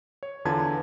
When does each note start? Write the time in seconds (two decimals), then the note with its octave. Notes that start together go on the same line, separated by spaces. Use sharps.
0.23 C#5
0.45 E2 D3 F4 B4 A5 G#6